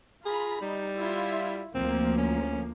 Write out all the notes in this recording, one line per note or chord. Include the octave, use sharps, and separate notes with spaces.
F4 G#4 A#5 B5
G3 D#4
E4 F4 E5
D2 F3 A#3 C4
C#4